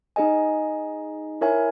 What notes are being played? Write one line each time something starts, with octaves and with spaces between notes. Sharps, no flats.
D#4 G#4 D#5 G#5
E4 A#4 C#5 E5 G#5